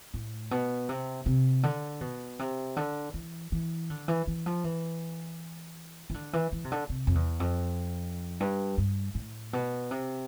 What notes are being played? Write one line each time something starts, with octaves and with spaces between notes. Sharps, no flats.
A2
B2
C3
C3
D3
B2
C3
D3
E3
E3
D3
E3
E3
F3
E3
E3
D3
E3
E3
C3
D3
C3
F2
E2
F2
G2
G2
A2
B2
C3